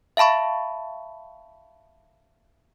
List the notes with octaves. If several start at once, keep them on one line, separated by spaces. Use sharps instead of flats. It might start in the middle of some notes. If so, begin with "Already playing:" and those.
E5 F5 A5 B5 C#6